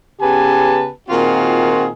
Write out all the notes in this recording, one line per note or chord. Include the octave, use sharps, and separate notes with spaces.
C#3 B3 G4 B4 G#5 A5
A#2 D#3 C4 F4 F#4 G#4